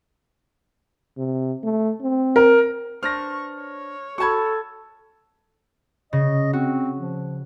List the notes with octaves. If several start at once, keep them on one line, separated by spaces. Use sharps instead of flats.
C3
A3
C4
A#4
D4 B4 C5 C#6 F6 A#6
C#5
F#4 A4 A5 B5 C#6 G#6
C#3 D#5
C4 F#4
F3